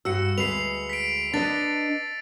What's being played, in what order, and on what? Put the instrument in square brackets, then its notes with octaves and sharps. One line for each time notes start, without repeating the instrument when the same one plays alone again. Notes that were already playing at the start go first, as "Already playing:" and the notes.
[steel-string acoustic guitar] G2 F#4 [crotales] E6 C#7
[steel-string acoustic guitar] D2 G#3 B4 [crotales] C7 F7
[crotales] B6 D7
[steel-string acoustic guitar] D4 B4 D#5 [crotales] A6